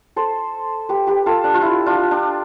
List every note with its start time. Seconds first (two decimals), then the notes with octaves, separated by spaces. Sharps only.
0.16 A4 C5
0.89 G4 B4
1.07 G4 B4
1.26 F4 A4
1.44 D4
1.54 F4
1.62 E4
1.86 D4 F4
2.11 D4